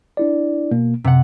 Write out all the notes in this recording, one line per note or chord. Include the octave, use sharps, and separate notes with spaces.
D4 E4 D5
B2 A#3
F#2 C3 F#5